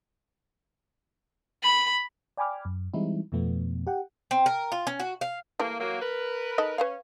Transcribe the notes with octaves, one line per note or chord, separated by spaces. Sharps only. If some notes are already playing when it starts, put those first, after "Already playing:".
B5
D5 G5 G#5 B5 D6 F6
F#2
E3 G3 G#3 C4 D#4 E4
F2 B2 F3 A3 B3
G4 F#5 G5
C4
A#4
F4
C#4
F#4
F5
E3 G3 A3 A#3
F#3 A#3
A#4 B4
D#4 A4 D#5
C#4 B4 C#5 F5